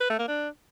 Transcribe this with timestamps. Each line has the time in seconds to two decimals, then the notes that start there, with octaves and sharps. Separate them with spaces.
0.01 B4
0.10 A3
0.19 A#3
0.28 D4